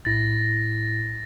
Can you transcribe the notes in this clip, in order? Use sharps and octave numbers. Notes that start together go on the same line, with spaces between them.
B1 A2 E4 A6 A#6